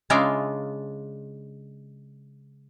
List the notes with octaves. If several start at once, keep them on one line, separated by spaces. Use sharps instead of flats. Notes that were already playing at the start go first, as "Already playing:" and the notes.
C#3 G#3 D4 F4 D5 E5